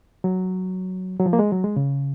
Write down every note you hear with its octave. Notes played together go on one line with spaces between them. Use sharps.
F#3
F#3
F3
A#3
G#3
F#3
G#3
C#3